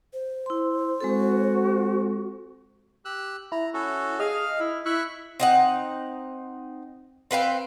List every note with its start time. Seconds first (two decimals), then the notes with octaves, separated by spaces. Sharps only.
0.13 C5
0.46 E4 C6
1.00 G#3 C4 F#4 A4
3.05 G4 E6 F#6
3.52 E4 A#5
3.74 C#4 F#4 A4
4.20 G#4 D#5 F5 F6
4.60 E4
4.86 E4 E5 C#6 F#6
5.40 C4 D#4 F#5
7.31 C4 B4 F5 G5